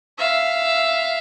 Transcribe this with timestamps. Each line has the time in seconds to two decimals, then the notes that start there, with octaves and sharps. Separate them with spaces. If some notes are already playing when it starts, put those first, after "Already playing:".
0.18 E5 F5